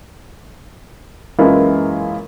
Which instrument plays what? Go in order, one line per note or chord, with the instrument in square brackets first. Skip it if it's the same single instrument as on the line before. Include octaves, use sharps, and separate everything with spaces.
[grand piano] F#2 E3 G#3 A#3 E4 F4